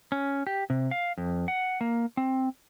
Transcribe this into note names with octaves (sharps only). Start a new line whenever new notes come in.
C#4
G4
C3
F5
F2
F#5
A#3
C4